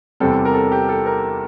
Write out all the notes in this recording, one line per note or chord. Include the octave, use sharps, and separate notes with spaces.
E2 C3 G3 C4 A4
A#4
A4
G4
A4
A#4